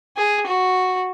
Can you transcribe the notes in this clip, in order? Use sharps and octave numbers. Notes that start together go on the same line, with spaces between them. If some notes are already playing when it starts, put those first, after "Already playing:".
G#4
F#4